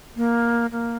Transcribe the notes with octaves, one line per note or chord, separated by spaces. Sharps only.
A#3
A#3